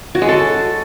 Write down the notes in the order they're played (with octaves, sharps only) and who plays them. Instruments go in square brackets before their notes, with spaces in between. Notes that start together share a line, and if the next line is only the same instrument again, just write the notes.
[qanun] F#4
G#3
A4